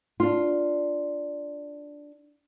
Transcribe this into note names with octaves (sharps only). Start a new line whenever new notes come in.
D4 F4